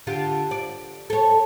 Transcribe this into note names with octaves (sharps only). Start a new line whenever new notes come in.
D3 F4 G4
D5
A4 C#5